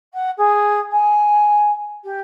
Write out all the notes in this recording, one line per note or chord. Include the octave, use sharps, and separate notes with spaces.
F#5
G#4
G#5
G4